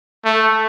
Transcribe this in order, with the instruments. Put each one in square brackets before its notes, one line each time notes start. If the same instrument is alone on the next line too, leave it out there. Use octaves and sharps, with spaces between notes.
[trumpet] A3